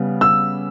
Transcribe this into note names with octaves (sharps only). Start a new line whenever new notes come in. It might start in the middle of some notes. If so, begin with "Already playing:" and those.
Already playing: C#3 G3 B3
E6